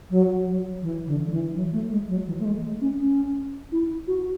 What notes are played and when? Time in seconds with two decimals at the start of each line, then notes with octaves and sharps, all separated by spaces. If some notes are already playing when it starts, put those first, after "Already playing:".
0.10 F#3
0.46 F#3
0.82 E3
1.06 D3
1.27 F#3
1.31 E3
1.55 F#3
1.73 A3
1.91 G#3
2.09 F#3
2.27 E3
2.39 A3
2.45 G#3
2.63 A3
2.81 C#4
2.99 C#4
3.72 E4
4.07 F#4